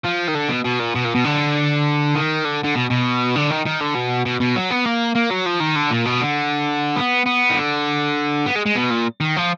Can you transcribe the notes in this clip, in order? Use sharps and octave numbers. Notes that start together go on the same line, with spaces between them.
F3
D#3
D3
B2
B2
A#2
B2
A#2
B2
D3
D#3
D3
D3
B2
B2
D3
D#3
D#3
D3
B2
B2
B2
F#3
B3
A#3
A#3
F#3
F3
D#3
D3
A#2
B2
D3
B3
B3
D#3
D3
B3
G#3
G#3
B2
A#2
D#3
F3